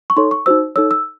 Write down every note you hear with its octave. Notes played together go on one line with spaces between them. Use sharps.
C#6
D#4 A4 C#5 C6
C#6
D#4 F#4 C5 E6
D#4 A4 C#5 E6
E6